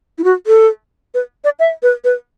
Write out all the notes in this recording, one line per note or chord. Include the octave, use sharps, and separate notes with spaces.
E4
F#4
A4
B4
D5
E5
B4
B4